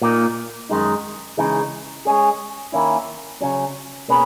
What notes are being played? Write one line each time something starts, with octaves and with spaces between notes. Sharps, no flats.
A#2 A#3 D#4
F#2 D#3 G#3 D#4
C#3 E3 G#3 D#4
G#3 C#4 G#4
D#3 A#3 C#4 E4
C#3 F#3 C#4
B2 A#3 C#4 G#4 B4